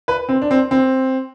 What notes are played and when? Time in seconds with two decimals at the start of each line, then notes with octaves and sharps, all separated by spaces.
0.08 B4
0.29 C4
0.42 D4
0.51 C4
0.71 C4